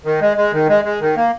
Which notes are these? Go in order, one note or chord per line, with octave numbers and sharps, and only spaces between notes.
D#3
G#3
G#3
D#3
G#3
G#3
D#3
A#3